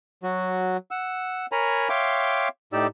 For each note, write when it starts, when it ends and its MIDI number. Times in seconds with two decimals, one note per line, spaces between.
0.23 0.77 54
0.23 0.77 66
0.91 1.46 78
0.91 1.46 88
1.52 1.88 70
1.52 1.88 73
1.52 1.88 80
1.52 1.88 82
1.52 1.88 83
1.89 2.48 73
1.89 2.48 76
1.89 2.48 77
1.89 2.48 79
1.89 2.48 84
1.89 2.48 86
2.73 2.87 45
2.73 2.87 63
2.73 2.87 67
2.73 2.87 74
2.73 2.87 88